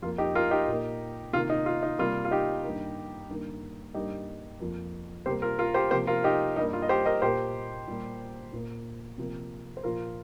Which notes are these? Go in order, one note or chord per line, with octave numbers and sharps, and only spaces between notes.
F2 F3 A#3 F4
D#4 G4
F4 A#4
D#4 G4
A#2 A#3
C3 D#3 A#3 F4
D#4
F4
D#4
C3 G3 A#3 F4
F4
D#4 G4
G2 D#3 A#3
G2 D#3 A#3
G2 G3 A#3 D#4 G4
F2 F3 A#3
C3 G3 A#3 G4 C5
F4 A#4
F4 A#4
G4 C5
C3 F3 A#3 G4 C5
F4 A#4
D#4 G4
G2 G3 A#3 D#4
F4
D#5
G4 C5
A#4 D#5
A#2 A#3 G4 C5
A#2 G3 A#3
A#2 A#3
C3 F3 A#3
C5
A#2 F3 A#3 F4 A#4